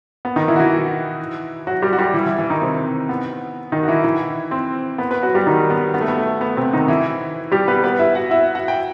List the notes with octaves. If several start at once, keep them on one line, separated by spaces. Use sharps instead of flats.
B3
D#3 D#4
E3 E4
F#4
E3 E4
F#3 F#4
G3 G4
F#4
G3 G4
E3 E4
E3 E4
E3 E4
D#3 D#4
C3 C4
B3
D#3 D#4
F#4
E3 E4
E3 E4
C4 C5
B3 B4
B3 B4
F#3 F#4
G3 G4
D#3 D#4
B3
B3
A3
B3
A3
B3
C3 C4
D#3 D#4
E3 E4
G3 G4
B3 B4
B3 B4
E4 E5
F#4 F#5
E4 E5
F#4 F#5
G5